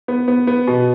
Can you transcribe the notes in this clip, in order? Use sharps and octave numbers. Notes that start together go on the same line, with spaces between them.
B3
B3
B3
B2